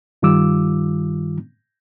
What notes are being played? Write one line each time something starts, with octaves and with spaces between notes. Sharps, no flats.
G2 D#3 G3 F4 D6 E6